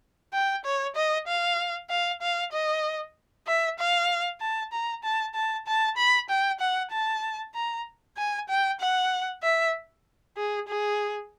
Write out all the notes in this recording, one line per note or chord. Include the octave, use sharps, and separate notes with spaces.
G5
C#5
D#5
F5
F5
F5
D#5
E5
F5
A5
A#5
A5
A5
A5
B5
G5
F#5
A5
A#5
G#5
G5
F#5
E5
G#4
G#4